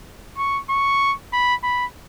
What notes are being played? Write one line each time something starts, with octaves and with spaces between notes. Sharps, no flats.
C#6
C#6
B5
B5